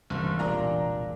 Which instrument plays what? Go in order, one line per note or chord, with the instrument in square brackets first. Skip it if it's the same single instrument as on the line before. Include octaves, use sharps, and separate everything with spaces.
[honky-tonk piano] F#1 [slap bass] C2 G2 D#3 [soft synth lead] E3
[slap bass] E1 C2 G3 [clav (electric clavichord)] A#2 [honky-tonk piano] D4 A#5